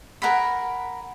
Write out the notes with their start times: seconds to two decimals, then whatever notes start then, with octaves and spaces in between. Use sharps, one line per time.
0.22 A#4 F#5 G#5 B5